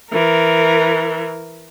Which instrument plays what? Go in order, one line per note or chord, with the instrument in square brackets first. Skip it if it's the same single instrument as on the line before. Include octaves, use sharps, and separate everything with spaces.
[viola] E3 A#4